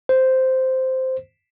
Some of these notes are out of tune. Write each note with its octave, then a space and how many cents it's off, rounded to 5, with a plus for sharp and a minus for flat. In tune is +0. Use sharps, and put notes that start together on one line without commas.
C5 -5